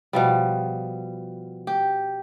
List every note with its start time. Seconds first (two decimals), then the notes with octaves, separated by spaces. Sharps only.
0.13 B2 F3 G3
1.67 G4